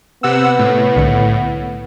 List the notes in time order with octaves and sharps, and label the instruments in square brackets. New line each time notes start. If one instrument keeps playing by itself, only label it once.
[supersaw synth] C3 F#5 E6 [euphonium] B3
[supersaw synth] A2
[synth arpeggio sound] C2 D3 C#7